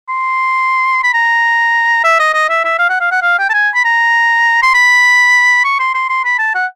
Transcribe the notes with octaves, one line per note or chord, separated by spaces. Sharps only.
C6
B5
A#5
E5
D#5
D#5
E5
E5
F5
F#5
F5
F#5
F5
G5
A5
G#5
B5
A#5
C6
B5
C#6
C6
C6
C6
B5
A5
F#5